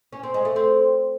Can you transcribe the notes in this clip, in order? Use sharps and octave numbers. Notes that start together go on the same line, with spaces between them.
C#4
C4
G#3
A3
C4